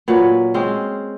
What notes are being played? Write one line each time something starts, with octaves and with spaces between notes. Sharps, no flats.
A#2 F#3 B4
G#3 C4 C#4